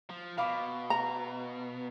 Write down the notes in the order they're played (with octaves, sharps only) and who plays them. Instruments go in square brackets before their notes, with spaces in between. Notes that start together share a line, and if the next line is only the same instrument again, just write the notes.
[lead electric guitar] F3
[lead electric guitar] B2 [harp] F5 B5 D6
[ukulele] A#5